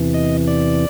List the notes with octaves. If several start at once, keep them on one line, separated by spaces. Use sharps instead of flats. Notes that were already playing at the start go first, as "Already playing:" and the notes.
Already playing: E2 C3 E3
D#5
D5